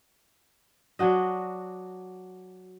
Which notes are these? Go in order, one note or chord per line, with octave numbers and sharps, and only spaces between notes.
F#3 D4 F#4 D#5